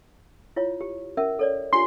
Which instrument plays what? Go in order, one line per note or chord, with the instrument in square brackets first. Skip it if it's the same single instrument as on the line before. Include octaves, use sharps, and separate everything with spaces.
[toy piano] E4 F4 C#5
G4
C#4 A#4 E5
A4 C#5 D5
[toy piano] D4 F4 G4 [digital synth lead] C6